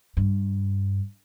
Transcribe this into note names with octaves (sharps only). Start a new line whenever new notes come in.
G2